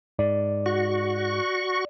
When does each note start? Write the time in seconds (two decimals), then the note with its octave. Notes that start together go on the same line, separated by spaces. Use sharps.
0.19 G#2 D5
0.66 F#4 C#6